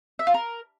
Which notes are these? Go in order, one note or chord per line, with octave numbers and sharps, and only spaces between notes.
E5
F4
A#4